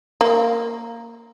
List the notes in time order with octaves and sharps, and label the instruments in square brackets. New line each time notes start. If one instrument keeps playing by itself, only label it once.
[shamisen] A#3